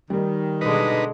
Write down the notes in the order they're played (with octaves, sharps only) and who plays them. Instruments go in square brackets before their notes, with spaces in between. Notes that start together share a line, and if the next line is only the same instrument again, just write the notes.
[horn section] D#3 [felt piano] G3
[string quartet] B2 D3 G#3 [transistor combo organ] D#4 B4